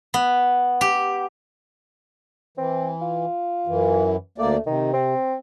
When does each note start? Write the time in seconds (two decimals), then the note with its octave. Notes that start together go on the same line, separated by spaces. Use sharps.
0.14 B3
0.81 G4
2.58 E3 C4
3.01 F4
3.67 F#2 E3
4.38 D2 A3 A#3 D5
4.66 C3 D#3
4.93 C4